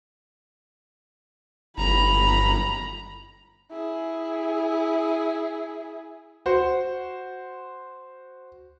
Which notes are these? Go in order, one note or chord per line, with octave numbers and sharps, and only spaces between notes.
G1 A#5 B5
E4 G#4
F#4 C5